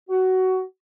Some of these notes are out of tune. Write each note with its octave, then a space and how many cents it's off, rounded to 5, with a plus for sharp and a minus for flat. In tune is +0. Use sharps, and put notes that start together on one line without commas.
F#4 +15